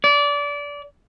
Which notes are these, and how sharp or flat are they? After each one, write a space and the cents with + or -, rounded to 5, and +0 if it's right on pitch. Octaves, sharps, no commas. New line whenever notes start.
D5 -25